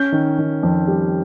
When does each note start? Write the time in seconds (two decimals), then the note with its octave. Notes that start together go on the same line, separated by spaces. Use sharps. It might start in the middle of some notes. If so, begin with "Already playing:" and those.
Already playing: C#4 G6
0.12 D#3
0.38 D#3
0.63 F2
0.88 G3